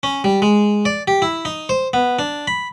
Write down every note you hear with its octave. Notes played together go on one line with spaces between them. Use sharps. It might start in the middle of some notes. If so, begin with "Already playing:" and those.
C#4
G3
G#3
D5
G4
E4
D#4
C5
B3
D4
B5